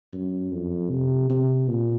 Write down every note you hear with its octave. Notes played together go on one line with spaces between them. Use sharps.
F#2
F2
C3
C3
A#2